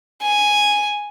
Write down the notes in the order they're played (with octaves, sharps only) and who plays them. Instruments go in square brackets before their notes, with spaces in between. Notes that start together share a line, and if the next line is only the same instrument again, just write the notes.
[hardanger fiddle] G#5